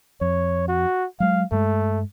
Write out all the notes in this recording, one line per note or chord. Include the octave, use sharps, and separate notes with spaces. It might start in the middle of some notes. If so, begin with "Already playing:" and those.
F2 C#5
F#4
F#3 G#3 F5
G2 G#3 A3